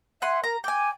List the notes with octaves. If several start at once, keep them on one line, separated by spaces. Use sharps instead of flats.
E5 F#5 G#5 C6
A#4 A#5
G5 G#5 D6